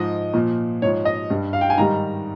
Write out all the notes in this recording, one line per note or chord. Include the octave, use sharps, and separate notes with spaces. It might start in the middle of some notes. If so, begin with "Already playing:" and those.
Already playing: G#2 F3 D#5
A#2 F3
G#2 F3 C#5
D#5
G2 G3
F5
G5
G#5
G#2 D#3 G3 A#5